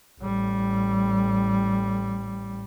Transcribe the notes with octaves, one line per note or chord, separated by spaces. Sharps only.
A1 G3